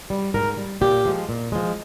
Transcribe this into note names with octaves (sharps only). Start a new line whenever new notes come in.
G3
G#2 A#4
G3
A#2 G4
F3 G#3
A#2
F3 G#3